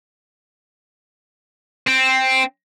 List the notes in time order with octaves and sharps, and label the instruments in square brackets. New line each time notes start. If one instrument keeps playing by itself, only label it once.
[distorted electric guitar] C4